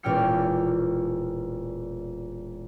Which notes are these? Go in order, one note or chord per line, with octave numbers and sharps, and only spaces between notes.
E1 A#2 C#4 G5 F6 C#7